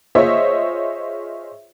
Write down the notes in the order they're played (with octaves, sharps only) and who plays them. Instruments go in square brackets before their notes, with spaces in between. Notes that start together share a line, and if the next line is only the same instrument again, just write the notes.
[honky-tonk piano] F4 G#4 C5 C#5 D#5 E5